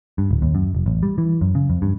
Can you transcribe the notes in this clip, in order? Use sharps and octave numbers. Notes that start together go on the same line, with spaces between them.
G2
D1
D#2
F#2
F1
A1
G3
E3
F#2
C#3
F2
G2